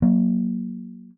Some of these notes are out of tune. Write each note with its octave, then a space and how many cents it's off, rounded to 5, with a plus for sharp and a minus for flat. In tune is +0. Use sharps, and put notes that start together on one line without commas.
F#3 +0 A#3 +10